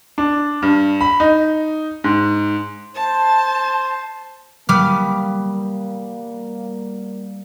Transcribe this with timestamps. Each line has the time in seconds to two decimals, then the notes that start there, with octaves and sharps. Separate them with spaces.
0.18 D4
0.62 G2
1.01 B5
1.20 D#4
2.04 G#2
2.95 C5 A5
4.69 G3 A#3 B3 D6 F6